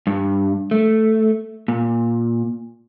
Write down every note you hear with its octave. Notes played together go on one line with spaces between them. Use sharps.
G2
A3
A#2